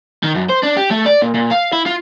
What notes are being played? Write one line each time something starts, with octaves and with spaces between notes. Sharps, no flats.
D#3
F#2
C5
D4
G4
A3
D5
A#2
A#2
F5
E4
F4